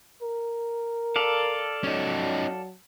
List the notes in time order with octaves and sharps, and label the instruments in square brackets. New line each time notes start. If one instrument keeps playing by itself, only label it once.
[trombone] A#4
[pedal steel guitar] A4 D5 F5
[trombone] F#3 [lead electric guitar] C#4 D#4